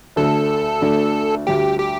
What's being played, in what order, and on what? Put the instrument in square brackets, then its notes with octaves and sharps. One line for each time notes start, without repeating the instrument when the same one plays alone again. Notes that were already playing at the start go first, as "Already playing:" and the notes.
[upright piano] D2 D3 A3 D4 [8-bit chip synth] A4
[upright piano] D2 D3 A3 D4
[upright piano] D2 D3 G3 [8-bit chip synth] G4
[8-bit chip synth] G4